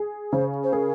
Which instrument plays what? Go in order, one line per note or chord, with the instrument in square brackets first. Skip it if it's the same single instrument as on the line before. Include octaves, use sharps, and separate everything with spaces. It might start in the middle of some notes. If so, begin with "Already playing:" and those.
Already playing: [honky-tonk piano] G#4
[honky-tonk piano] C#3 [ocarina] C5
[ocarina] C5
[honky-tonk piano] G#4 [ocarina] A#4